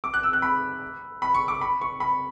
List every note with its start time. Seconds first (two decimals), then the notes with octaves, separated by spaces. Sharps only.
0.04 D6
0.14 F#6
0.23 E6
0.33 F#6
0.42 B5
1.22 B5
1.34 C#6
1.48 D6
1.61 B5
1.81 C#6
2.00 B5